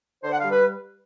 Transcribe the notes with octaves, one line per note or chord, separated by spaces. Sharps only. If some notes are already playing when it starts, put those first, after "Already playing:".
D3 C5
F#5
G3 F5
B4